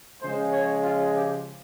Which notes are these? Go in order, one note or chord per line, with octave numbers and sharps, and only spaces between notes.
C#3 F3 G#3 C5
C#5
F4
G4